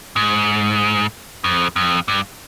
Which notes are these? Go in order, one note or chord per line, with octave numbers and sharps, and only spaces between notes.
G#2
F2
F2
G2